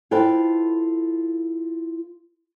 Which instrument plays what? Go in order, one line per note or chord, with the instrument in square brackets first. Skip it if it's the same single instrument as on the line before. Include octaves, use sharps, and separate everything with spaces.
[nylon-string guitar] E4 F4 A4 B4 C5 G5